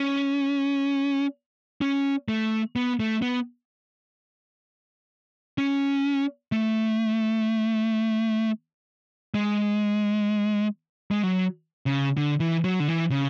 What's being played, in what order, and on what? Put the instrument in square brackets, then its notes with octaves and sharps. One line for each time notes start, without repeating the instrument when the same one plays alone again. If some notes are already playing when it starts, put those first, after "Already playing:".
Already playing: [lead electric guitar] C#4
C#4
A3
B3
A3
B3
C#4
A3
G#3
G#3
F#3
C#3
D3
E3
F#3
D3
E3
C#3